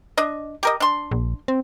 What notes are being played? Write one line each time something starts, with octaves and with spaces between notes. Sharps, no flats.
D4 D#5
G4 A#4 D#5
D4 C6
A#1
C4